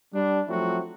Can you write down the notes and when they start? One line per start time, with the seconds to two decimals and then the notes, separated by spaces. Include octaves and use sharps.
0.14 G3 D4
0.47 F3 F#3 A3 C4 E4 F#4